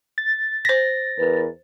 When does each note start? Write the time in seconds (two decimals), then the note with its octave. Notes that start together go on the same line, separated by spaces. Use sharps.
0.18 A6
0.65 C5 A#6 B6
1.19 E2 A#4 B4